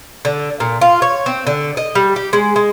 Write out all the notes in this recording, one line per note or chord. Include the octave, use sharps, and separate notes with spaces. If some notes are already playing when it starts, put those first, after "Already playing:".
D3
A#2
F4
C#5
C4
D3
D#5
G3
G4
G#3
G#3